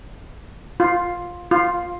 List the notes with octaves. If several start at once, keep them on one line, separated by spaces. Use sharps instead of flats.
F4
F4